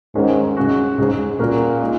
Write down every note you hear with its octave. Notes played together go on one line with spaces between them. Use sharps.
G#2 D#3 G#3 C#4 G#4
C#3 G#3 F#4
G#2 C#3 G#3 C#4 G#4
A#2 C#3 A#3 F#4 A#4
G#3 D#4